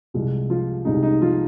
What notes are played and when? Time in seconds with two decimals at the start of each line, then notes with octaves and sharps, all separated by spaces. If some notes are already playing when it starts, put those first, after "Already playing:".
0.14 C2 C3 F3 G#3
0.50 F3 F4
0.85 C2 C3 F3 G#3 D#4
1.03 D#4
1.21 F3 F4